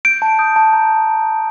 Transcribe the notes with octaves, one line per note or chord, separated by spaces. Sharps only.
G6 D7
A5
D#6 G6
A5
A#5 G6